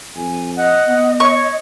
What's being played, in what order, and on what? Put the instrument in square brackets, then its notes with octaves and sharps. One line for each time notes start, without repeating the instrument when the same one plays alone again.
[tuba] F2 [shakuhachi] G#5
[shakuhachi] D#5 [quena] F#5
[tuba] B3
[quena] C#5 [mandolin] C#6